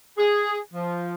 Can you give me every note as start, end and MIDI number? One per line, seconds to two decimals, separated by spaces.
0.18 0.58 68
0.73 1.15 53